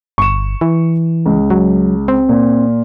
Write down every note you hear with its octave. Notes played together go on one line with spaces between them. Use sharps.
G1 C#6 E7
E3
C#2
F#3
C4
A#2